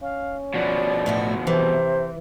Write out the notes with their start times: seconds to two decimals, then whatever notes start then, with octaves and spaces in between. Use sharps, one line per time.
0.02 C#4 F5
0.54 B2 F3 D5
1.06 A2 A3 F#4
1.47 C3 E3 C5